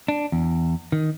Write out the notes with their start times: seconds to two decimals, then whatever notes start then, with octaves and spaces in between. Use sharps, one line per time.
0.08 D4
0.32 E2
0.92 D#3